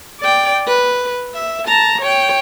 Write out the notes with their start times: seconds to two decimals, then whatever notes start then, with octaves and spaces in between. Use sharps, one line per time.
0.20 D5 G5
0.68 B4
1.34 E5
1.68 A5 A#5
2.02 C#5 G5